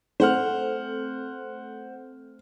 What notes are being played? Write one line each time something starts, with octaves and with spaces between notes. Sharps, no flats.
A3 C4 C5 F#5 F6